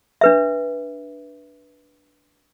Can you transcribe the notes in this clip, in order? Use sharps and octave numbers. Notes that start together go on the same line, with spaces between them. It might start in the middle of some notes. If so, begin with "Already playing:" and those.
D4 B4 E5